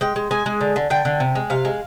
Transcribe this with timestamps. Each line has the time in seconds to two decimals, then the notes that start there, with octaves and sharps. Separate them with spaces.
0.01 G#3 G5
0.16 G#3
0.31 G#3 G#5
0.46 G#3
0.61 D3
0.76 D3
0.90 D3 G5
1.05 D3
1.20 C3
1.35 G#3
1.50 C3 F5
1.65 G#3